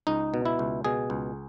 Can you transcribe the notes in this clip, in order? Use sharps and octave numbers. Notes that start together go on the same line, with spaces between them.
C#2 D#4
B2
E4
C#2
B2 G#4
C#2